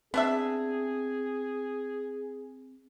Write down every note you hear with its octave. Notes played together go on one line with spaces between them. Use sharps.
B3 C4 D4 G#4 E5